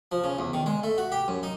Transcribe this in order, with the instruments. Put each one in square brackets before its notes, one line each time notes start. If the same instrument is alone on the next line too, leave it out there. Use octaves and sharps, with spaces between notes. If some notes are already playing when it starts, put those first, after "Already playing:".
[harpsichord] F3
C#3
E2
D#3
G#3
A3
F#4
G4
F#2
D#4